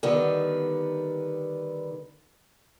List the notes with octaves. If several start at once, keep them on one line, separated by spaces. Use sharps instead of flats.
D3 D#3 G3 B3